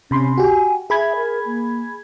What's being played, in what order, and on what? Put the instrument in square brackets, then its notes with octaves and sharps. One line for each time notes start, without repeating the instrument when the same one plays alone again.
[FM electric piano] C3 B5 C6 [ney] C#4
[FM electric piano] F#4 G4 [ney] G#5
[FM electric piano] G#4 B5 G#6 [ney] E5
[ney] A#4
A#3